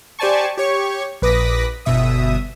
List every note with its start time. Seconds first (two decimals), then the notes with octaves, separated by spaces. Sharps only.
0.19 G4 C5 D5 G#5 A5 C#6
0.58 G4 C#5 C#6
1.22 A#1 B4 D6 D#6 A#6 B6
1.85 G1 B2 E5 D#6